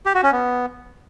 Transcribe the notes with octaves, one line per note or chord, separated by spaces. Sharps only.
G4
F#4
C#4
B3